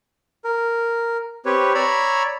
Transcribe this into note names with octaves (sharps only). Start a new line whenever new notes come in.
A#4
C4 G4 B4 C#5
C#5 D5 A#5 B5 E6